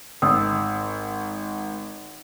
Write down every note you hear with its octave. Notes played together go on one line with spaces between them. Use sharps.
G#1 D#6 E6